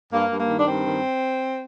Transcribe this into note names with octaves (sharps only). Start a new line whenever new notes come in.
G2 A#3
G2
A#3
D#3
D4
G2 C4
D#3